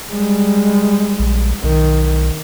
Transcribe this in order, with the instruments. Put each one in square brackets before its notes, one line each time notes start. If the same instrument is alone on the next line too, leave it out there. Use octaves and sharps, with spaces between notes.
[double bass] G3 G#3
[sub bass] A#1
[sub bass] B1 [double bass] D#3